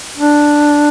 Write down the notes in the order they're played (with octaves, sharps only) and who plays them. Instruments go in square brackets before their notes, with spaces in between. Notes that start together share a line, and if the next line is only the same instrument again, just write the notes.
[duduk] D4